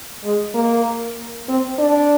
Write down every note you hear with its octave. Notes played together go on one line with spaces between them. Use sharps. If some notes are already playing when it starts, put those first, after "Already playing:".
G#3
A#3
C4
D4